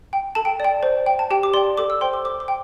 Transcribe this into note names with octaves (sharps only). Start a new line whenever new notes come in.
G5
A4 A5
G5
D5 G5
C5
G5
A5
G4 G5
D6
D5 G5 C6
A4 D6
E6
C5 G5 C6
D6
C5 D6
D6
G5